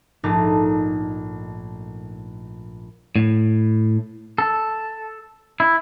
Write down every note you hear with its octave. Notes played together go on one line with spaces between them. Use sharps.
A#1 G#2 A3 D#4 A#5 D6
A2
A4
E4